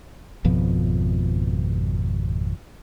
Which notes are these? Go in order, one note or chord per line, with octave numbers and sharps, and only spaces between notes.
G#1 F2 B2 F3